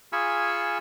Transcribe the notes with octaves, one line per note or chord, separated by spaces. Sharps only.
F4 G#4 G#5 B5 C#6 E6